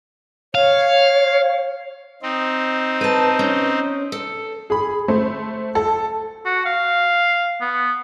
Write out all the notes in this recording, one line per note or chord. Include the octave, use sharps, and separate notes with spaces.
C#5 F5
C4 D#4
B4 A5
C#4
A4
G#4 B5
A3 C5
A4
F#4
F5
B3